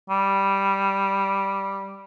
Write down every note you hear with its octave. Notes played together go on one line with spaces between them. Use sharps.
G3